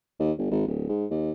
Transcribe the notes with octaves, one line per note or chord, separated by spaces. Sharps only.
D#2
G1
G#1
D1
G#2
D#2